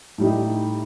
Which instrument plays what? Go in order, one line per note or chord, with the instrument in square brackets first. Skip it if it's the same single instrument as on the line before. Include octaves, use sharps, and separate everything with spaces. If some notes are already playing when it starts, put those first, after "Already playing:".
[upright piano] A2 G3 D#4 G4